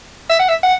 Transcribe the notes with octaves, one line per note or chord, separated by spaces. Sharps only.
E5
F#5
E5
F#5